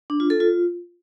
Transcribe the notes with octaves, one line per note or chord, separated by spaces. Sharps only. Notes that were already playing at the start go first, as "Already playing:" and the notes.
D4
F4
A4
F4